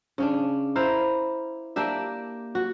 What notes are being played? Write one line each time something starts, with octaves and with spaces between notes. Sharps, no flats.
C#3 C#4 D4
E4 A#4 C5 F5
A#3 D4 G4 E5
F#4